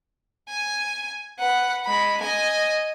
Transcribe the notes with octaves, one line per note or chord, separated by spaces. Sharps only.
G#5
B4 F#5
G#3 B5
D#5 G#5